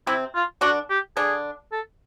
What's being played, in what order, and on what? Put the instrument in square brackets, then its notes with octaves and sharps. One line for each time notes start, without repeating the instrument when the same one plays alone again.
[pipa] C3 C4 [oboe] E4
[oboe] F4
[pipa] D3 D4 [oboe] F#4
[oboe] G4
[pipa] D3 D4 [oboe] G#4
[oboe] A4